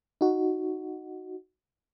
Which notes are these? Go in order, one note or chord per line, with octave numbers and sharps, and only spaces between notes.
D#4 F#4